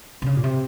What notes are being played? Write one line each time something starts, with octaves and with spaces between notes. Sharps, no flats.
C3
C#3
A#2
C3